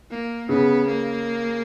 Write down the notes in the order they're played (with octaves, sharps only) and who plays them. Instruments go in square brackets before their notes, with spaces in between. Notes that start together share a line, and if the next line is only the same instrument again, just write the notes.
[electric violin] A#3
[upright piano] C#3 [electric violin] B3
[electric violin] A#3